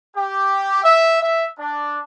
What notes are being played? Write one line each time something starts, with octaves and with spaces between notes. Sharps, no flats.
G4
E5
E5
D4